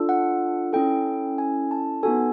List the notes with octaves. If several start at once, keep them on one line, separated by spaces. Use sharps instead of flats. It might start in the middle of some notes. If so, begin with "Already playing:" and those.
Already playing: D4 F4 A4
F#5
C#4 E4 A4 G5
G#5
A5
B3 D#4 F#4 A4 G#5